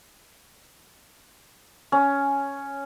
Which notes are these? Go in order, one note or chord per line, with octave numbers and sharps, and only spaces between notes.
C#4